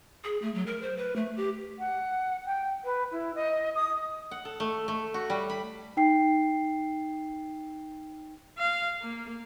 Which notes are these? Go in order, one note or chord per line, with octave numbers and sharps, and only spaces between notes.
G#4
A3
F#3
A#4
C5
B4
A3
G4
F#5
G5
B4
E4
D#5
D#6
F#5
A4
A3
A3
F#4
G3
B5
D#4 G5 C7
F5
A#3